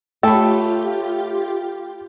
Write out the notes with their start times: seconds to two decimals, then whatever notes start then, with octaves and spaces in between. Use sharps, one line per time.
0.23 A3 F4 G4 A4 C#5 G5 B5